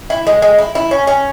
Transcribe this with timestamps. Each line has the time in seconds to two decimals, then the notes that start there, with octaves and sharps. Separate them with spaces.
0.10 E4
0.27 G#3
0.42 G#3
0.58 E4
0.75 E4
0.91 C#4
1.07 C#4